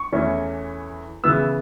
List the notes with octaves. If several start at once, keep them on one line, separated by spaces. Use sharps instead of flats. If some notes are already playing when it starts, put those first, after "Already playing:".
Already playing: C#6
E2 E3 A3 C#4
C#3 E3 B3 E6